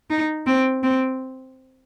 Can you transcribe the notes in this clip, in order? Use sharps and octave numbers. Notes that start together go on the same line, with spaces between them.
D#4
C4
C4